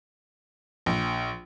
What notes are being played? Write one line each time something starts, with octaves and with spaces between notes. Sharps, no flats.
A#1